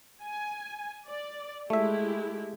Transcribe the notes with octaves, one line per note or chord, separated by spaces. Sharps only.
G#5
D5
G#3 A3 E4 G4 E5